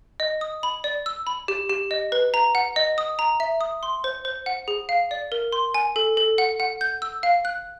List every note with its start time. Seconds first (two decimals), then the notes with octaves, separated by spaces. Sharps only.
0.20 D#5
0.41 D#6
0.63 B5
0.84 D5
1.06 E6
1.27 B5
1.48 G4
1.70 G4
1.91 D#5
2.12 B4
2.34 A#5
2.55 F#5
2.76 D#5
2.98 D#6
3.19 A#5
3.40 E5
3.61 D#6
3.83 C6
4.04 C5
4.25 C5
4.46 F#5
4.68 G#4
4.89 F5
5.11 D5
5.32 A#4
5.52 C6
5.74 G#5
5.96 A4
6.17 A4
6.38 F#5
6.60 F#5
6.81 G6
7.02 E6
7.23 F5
7.45 F#6